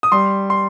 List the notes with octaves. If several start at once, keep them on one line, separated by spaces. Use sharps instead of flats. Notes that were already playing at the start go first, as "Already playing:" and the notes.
D#6
G3 C6
C6